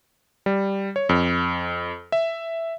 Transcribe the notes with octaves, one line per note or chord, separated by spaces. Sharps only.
G3
C#5
F2
E5